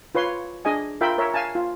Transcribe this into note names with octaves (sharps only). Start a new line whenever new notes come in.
F4 B4 C#5 C6
D4 G#4 D#5 G#5
F4 A#4 E5 G5 B5
A#4 C#5 E5
F5 G#5 A5
F4